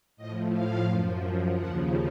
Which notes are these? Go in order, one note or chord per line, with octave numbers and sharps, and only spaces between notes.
A2 F3 D#5
F5
F#2 F3
D#2 C#3 F3 F#5